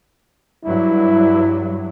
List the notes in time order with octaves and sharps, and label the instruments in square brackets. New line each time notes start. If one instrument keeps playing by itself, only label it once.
[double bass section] G2 F#3 [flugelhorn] E4